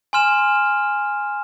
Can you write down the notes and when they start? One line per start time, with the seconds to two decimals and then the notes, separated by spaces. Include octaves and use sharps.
0.13 G#5 C6 F6 E7